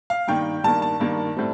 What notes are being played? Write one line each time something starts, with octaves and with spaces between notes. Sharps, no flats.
F5
G2 D#3 A#3 G5
G2 D#3 A#3 A5
A5
G2 D#3 A#3
A2 G3 C4